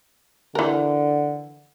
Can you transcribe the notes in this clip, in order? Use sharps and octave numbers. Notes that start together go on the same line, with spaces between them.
D3 E3 A#4